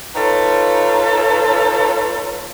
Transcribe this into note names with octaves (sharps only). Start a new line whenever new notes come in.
D#4 F4 A4 B4 C#5